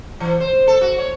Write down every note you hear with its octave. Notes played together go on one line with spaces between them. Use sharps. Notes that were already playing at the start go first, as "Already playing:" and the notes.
E3
C5
A4
F#4
C#5